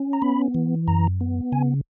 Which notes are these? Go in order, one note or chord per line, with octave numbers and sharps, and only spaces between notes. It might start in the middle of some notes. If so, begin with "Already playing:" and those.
Already playing: C#4
A#5
B3 B5
E3
F#2 A#5
B3
C#3 G#5